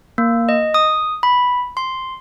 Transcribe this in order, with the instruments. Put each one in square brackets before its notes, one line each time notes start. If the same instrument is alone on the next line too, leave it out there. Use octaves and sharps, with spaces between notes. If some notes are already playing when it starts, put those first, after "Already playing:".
[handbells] A#3
D#5
D#6
B5
C6